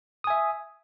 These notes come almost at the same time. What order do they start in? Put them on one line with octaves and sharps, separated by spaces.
D#6 G#5 E5